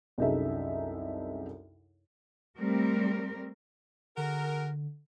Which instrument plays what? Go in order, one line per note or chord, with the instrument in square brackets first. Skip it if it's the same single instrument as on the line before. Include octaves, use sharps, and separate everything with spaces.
[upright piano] C2 F#2 D#4 G#4 A4 E5
[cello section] G3 A3 C4 A#4
[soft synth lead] D3 [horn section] F#4 G#4 A#4